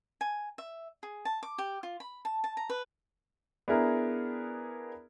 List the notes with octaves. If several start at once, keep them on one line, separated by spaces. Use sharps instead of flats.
G#5
E5
G#4
A5
D6
G4
F4
B5
A5
A5
A#5
B4
B3 D4 E4 G#4 A#4